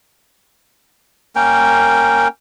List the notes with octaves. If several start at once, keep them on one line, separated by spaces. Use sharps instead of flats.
A#3 C#4 A#4 G5